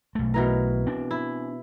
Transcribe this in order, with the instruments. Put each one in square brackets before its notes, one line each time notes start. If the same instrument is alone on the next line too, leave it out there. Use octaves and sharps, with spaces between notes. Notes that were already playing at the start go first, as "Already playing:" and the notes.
[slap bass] B1 A3
[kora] B2 E3 A#4
[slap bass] C4 D4
[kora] E4